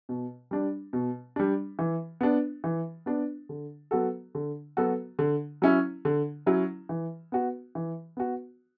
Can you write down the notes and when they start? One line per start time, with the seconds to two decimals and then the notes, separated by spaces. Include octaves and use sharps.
0.09 B2
0.51 G3 D4
0.93 B2
1.36 G3 D4
1.79 E3
2.21 B3 D4
2.64 E3
3.06 B3 D4
3.49 D3
3.91 F#3 B3 F#4 A4
4.35 D3
4.77 F#3 B3 F#4 A4
5.19 D3
5.62 F#3 C#4 E4
6.05 D3
6.46 F#3 C#4 E4
6.89 E3
7.32 B3 F#4
7.75 E3
8.17 B3 F#4